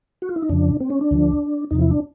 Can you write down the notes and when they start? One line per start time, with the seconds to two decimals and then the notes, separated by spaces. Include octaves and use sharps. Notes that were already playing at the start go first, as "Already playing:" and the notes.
0.22 F#4
0.29 F4
0.36 E4
0.42 D#4
0.50 F2 C#3 F3 D4
0.80 C4
0.90 C#4
1.01 D4
1.11 D2 D3 F3
1.71 E2 C3 F3 D#4
1.81 E4
1.91 D4